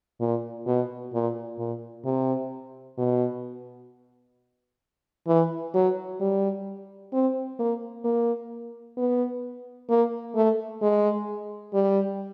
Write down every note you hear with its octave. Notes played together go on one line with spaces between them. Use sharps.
A#2
B2
A#2
A#2
C3
B2
E3
F#3
G3
C4
A#3
A#3
B3
A#3
A3
G#3
G3